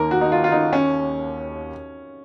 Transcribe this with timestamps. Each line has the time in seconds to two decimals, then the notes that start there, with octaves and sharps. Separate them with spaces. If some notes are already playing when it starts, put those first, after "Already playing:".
Already playing: D#2 D#3 A#4
0.11 F#4
0.21 D#4
0.32 F4
0.44 F4
0.52 D#4
0.73 C#4